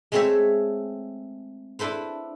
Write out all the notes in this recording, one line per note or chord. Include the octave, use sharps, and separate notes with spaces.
G#3 A3 C4 C5 C#5 E5
D4 E4 A4 B4 C5